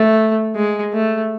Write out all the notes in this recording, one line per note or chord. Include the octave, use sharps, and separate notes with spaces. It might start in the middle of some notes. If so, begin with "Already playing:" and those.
Already playing: A3
G#3
A3